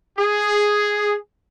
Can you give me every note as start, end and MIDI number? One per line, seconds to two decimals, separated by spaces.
0.19 1.16 68